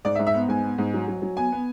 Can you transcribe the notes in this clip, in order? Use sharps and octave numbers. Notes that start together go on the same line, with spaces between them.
G#2 D5
E5
G#2
E5
B3
G#2 G#5
B3
G#2
F#3
F#3
F#3
B3 G#5
B3